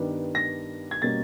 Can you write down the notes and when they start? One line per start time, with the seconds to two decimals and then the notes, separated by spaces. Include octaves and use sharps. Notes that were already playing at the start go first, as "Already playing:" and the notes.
Already playing: G2 D#3 G3 B3 D4
0.35 A#6
0.91 G#6
1.02 B2 G3 A#3 C#4 A6